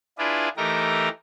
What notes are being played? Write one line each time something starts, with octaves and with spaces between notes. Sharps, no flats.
D4 E4 F4 G#4 B4 D5
E3 A3 D#4 G4 A#4 A#5